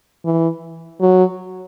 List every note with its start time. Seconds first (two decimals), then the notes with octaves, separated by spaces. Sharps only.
0.25 E3
1.01 F#3